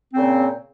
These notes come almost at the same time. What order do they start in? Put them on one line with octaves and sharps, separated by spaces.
C4 C#3 A#2